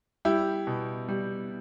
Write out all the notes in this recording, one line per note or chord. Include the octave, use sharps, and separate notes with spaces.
G3 E4 G4
B2
G3